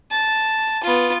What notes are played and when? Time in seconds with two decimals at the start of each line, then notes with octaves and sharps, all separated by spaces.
0.11 A5
0.83 B3 F4